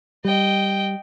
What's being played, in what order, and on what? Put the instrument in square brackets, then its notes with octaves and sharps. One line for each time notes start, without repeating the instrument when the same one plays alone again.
[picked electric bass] G3 [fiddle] D#5 G5